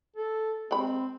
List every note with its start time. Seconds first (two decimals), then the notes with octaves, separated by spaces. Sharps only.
0.16 A4
0.71 G#3 C4 B5